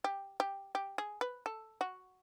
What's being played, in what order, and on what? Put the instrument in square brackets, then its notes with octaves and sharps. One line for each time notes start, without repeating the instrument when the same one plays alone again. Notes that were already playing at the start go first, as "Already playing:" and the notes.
[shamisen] G4
G4
G4
G#4
B4
A4
F#4